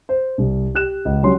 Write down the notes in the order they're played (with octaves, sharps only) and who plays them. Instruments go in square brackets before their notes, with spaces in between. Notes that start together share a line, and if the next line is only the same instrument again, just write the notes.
[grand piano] C5
C2
G4 F#6 E7
C#2
F#3 G3 C#4 C6